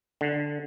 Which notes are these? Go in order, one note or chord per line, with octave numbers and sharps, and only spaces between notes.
D3